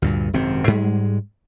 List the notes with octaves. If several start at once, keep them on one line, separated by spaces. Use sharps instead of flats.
D2 G2 A#2
G#1 F#2 C3 C4
G#2 G3 G#3